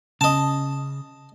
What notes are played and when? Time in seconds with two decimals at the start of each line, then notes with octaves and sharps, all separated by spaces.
0.21 C#3 D#5 A5